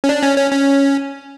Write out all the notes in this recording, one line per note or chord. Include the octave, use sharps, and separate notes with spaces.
C#4
D4
C#4
C#4
C#4